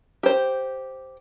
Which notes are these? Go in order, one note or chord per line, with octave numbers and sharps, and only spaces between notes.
G4 C5